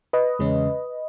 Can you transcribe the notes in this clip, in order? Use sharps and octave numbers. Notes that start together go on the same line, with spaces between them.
B4 D#5
E2 C#3 G#3 C#4